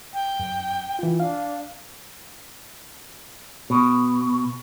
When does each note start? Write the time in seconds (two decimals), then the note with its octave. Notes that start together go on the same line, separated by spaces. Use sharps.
0.13 G5
0.40 F#2
0.99 E3 F4
1.20 D4 F5
3.70 B2